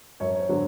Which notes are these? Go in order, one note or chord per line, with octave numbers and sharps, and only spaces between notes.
F#2 C#5
C#5
C5
D3 F#3